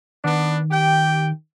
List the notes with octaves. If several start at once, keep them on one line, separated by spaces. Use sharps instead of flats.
D#3 B3 D4
G4 G5